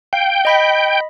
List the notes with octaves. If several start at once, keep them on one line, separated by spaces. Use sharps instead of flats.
F5 G5
D#5 B5 B6